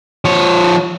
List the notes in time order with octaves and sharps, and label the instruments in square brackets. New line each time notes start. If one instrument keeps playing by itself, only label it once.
[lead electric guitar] F3 C#5